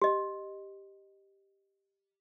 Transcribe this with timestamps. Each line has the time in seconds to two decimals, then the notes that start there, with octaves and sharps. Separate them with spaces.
0.02 G4 D#5